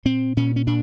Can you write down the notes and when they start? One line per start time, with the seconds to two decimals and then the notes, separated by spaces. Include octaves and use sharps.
0.05 A#2 C4
0.37 A#2 C#4
0.56 C#4
0.67 A#2 D4